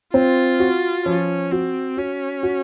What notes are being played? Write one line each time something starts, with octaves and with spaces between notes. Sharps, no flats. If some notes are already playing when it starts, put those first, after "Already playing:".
C4 F4
F#4
F3 C#4
C4 F#4
C#4 F#4
F#4